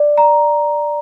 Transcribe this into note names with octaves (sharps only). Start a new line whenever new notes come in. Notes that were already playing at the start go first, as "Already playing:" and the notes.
Already playing: D5
A#5